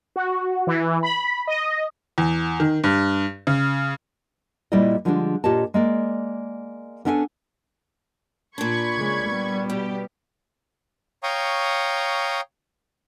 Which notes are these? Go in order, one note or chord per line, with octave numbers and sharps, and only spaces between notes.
F#4
E3
B5
D#5
E2
D#3
G2
C#3
A#2 G3 E4 B4 D5 D#5
D3 F3 G3 G#3 C#4 D4
A#2 F4 G4 C#5 D#5 A5
G#3 A#3 D5
B3 C#4 D4 E4 A4 G#5
A#2 D4 B5 C#6 G#6
C#3 G#3
G3 B3
B2 G4
C#5 F5 G5 A#5 C#6 D#6